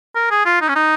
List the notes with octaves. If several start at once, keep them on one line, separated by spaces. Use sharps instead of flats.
A#4
G#4
F4
D#4
C#4
D#4